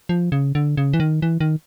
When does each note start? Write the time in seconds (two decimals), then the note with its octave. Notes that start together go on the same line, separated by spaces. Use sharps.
0.09 F3
0.32 C#3
0.55 D3
0.77 C#3
0.93 E3
1.00 D#3
1.22 E3
1.40 D#3